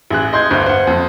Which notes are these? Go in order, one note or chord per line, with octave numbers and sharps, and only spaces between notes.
A1 G#4 F#6
D#5 C6 G6 G#6
D2 G2 C5
C5 F#5
F2